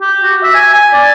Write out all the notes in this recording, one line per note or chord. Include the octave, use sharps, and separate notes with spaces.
G4
F#4
E5
G#5
G#5
D5